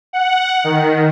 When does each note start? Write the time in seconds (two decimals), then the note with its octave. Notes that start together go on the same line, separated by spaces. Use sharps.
0.13 F#5
0.64 D#3